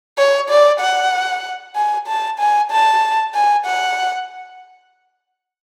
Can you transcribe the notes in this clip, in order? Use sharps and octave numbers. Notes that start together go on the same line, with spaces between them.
C#5
D5
F#5
G#5
A5
G#5
A5
G#5
F#5